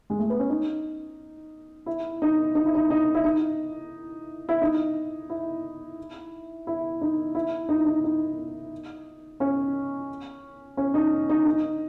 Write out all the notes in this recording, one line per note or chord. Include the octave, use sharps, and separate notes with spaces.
G#3
A3
B3
C#4
D#4
E4
D#4
D#4
E4
D#4
D#4
E4
D#4
E4
D#4
E4
E4
D#4
E4
D#4
E4
D#4
D#4
C#4
C#4
D#4
D#4
D#4